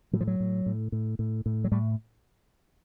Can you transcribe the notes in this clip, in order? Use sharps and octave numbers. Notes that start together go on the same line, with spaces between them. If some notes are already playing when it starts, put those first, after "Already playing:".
A2 F#3
F3
F#3
A2
A2
A2
A2
A2
F#3
A2 G3